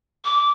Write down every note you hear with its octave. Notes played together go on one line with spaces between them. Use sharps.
D6